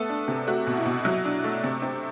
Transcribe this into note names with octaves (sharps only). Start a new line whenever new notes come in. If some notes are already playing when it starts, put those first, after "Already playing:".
Already playing: A3 B3 A4
D4
C3
A3 F#4
B2
E4
B2
F#3
D4
A3
C3
C4